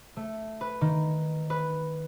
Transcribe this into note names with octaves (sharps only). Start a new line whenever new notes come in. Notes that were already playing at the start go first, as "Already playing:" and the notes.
A3
B4
D#3
B4